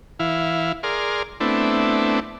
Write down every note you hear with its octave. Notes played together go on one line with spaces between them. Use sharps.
E3 E4 F5
G#4 A#4 D5 C6 F6
A3 B3 C4 D4 E4